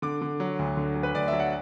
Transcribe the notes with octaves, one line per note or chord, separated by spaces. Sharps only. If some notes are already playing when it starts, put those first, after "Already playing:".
D3 D6
D3
F#3
D2
D3
F#3
B4
D2 D5
F#3 E5
F#5